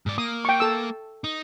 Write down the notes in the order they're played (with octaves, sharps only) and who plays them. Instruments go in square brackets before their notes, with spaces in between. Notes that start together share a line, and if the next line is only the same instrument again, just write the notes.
[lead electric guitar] G#2 D5
[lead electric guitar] A#3 [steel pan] D#6
[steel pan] G5 C#6
A4 E6
[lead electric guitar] D#4